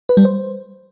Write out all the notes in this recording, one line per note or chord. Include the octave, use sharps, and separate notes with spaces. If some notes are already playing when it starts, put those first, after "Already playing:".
B4
G3
C5